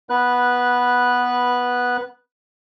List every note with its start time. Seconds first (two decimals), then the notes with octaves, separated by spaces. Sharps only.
0.10 B3 B4 F#6